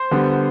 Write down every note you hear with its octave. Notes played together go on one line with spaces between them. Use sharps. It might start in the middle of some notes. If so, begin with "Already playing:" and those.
Already playing: C5 C6
D3 G3 B3